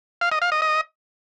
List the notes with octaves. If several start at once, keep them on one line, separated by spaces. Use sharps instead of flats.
F5
D#5
F5
D#5
D#5